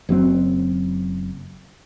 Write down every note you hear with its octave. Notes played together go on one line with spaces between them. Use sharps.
F#1 F#3 C4